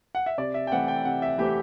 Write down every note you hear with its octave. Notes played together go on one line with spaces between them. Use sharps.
F#5
E5
C3 D5
E5
G5
E3 A3 C4 F#5
G5
C3 F#5
E5
E3 A3 C4 G4